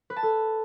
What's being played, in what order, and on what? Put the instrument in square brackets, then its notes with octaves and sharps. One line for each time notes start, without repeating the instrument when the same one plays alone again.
[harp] B4
A5
A4